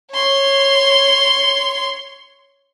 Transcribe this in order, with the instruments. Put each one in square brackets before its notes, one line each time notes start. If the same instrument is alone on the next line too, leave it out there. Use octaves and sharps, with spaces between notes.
[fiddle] C#5 C6